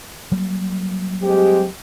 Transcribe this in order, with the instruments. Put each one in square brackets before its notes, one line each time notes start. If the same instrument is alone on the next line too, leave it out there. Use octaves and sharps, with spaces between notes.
[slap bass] F#3 G3 A#3
[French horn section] G#3 C4 G4